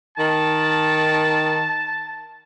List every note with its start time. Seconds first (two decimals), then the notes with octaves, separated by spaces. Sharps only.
0.18 D#3 A5